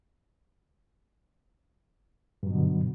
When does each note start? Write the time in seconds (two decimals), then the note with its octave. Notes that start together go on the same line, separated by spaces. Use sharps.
2.43 G2
2.47 F#3
2.50 B2
2.54 D3